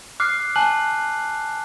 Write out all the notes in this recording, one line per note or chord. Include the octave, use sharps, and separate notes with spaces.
D6 F6 F#6 C7
G#5 A5 F#6 F#7